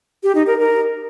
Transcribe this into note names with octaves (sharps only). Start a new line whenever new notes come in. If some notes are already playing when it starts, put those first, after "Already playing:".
G4
D#4
A#4
A#4